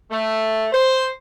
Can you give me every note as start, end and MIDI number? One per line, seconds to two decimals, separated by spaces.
0.10 0.66 57
0.72 1.06 72